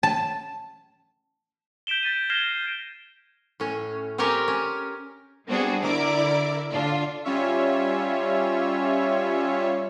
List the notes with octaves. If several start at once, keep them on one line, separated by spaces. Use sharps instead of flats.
A5
G6 B6 D7 E7 G7
G6 A6 B6 D#7
F6 G#6 A#6 C7 E7 G7
C7
A2 C#4
C4 C#4 G4 A#4 C#5 D5
C#4
G3 B3 C4 D4 F#4 G#4
D3 E4 A#4 D5 D6
D3 D4 F4
G3 C#4 F4 C#5 E5